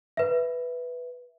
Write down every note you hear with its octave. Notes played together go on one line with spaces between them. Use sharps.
B4 E5